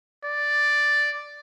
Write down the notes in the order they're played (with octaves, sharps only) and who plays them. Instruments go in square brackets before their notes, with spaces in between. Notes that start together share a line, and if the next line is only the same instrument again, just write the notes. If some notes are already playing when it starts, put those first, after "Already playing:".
[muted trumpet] D5